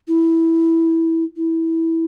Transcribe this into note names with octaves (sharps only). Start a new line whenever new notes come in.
E4
E4